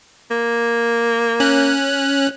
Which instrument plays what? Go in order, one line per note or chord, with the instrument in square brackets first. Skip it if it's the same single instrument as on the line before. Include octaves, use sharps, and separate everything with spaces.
[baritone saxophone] A#3
[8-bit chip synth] C#4 F#6